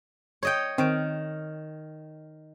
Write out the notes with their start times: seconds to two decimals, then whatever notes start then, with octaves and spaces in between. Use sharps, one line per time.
0.43 C#5 D#5 G5
0.78 D#3 C4 C#6 D7